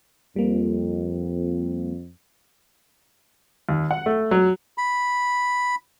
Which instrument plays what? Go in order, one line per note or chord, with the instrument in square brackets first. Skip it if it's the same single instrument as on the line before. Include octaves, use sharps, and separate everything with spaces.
[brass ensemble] F2 [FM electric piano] G3 A#3
[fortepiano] D#2
F#5
A3
F#3
[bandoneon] B5